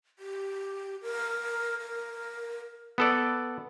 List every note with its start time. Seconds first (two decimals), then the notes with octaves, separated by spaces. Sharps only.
0.19 G4
1.02 A#4
1.80 A#4
2.98 B3 A4 D5